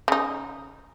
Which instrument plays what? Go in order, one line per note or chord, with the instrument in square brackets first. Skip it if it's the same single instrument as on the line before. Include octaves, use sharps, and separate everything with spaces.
[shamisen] C#3 D#4